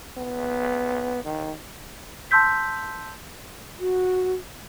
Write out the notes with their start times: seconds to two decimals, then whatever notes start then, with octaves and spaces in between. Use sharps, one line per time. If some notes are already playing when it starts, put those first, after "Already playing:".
0.18 B3
1.24 D#3
2.31 A5 C6 E6 G6 B6
3.80 F#4